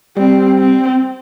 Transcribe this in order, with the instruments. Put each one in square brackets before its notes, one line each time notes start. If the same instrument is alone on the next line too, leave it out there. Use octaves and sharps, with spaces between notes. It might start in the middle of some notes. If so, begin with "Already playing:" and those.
[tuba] G3 [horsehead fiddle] C4
[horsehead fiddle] C4